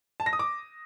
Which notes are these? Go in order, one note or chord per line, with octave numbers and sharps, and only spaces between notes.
A5
A#6
D#6
D6